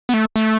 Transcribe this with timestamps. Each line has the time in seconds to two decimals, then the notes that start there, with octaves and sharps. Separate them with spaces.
0.09 B3
0.14 A3
0.36 A3